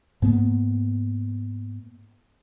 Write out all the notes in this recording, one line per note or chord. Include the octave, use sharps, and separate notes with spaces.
G#2 A#3 B3